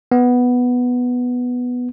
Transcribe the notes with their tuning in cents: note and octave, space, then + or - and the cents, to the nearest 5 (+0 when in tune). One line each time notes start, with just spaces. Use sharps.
B3 +0